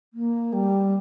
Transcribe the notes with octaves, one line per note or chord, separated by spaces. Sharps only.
A#3
G3